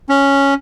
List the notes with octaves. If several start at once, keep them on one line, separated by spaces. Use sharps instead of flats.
C#4